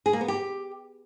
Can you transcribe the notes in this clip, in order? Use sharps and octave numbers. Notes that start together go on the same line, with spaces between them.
G#4
A#3
B3
G4